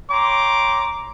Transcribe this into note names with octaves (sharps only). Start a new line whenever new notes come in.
C#5 G5 A#5 C6 D6